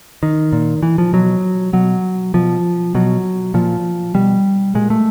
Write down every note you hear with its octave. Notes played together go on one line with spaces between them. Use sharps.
D#3
A#2
E3
F3
B2 F#3
B2 F#3
B2 F3
B2 F#3
A#2 F3
B2 G3
A#2 G#3
A3